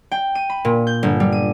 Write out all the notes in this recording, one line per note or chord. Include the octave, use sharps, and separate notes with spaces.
G5
D#7
B5
A#2
G6
G1
G3
D#7